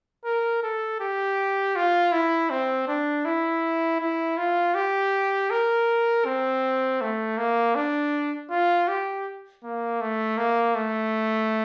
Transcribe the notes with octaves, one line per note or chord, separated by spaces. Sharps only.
A#4
A4
G4
F4
E4
C4
D4
E4
E4
F4
G4
A#4
C4
A3
A#3
D4
F4
G4
A#3
A3
A#3
A3